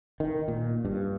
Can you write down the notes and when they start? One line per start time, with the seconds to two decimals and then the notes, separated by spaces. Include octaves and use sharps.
0.20 D#3
0.48 A#2
0.85 G2